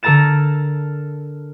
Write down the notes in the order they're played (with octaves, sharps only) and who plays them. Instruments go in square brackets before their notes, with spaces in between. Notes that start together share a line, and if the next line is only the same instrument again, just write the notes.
[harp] D3 A4 A#4 A#5 A6 E7